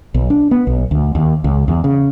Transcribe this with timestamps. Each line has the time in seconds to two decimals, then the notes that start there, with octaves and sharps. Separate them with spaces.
0.14 B1
0.30 D4
0.51 B3
0.67 B1
0.91 D2
1.15 D#2
1.44 C#2
1.68 E2
1.84 C#3